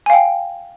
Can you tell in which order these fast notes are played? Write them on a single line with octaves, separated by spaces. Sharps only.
G#5 F5 G5